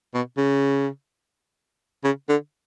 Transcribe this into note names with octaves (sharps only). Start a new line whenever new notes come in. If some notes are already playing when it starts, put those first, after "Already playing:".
B2
C#3
C#3
D3